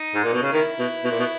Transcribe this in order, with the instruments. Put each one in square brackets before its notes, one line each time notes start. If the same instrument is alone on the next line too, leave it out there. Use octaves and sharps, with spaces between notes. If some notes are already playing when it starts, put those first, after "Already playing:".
Already playing: [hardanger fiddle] D#4
[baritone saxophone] G#2
A#2
B2
C#3
[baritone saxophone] D#3 [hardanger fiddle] E4
[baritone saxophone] B2
B2
A#2
B2